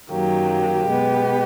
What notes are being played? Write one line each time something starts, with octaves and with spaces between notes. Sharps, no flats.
F#2 D#3 F#3 A#3 G4
B2 G#3 B3